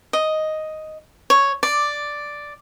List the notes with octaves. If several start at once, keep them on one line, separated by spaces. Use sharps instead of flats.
D#5
C#5
D5